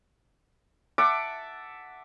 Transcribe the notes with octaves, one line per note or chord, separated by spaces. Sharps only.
E5 F#5 A5 D6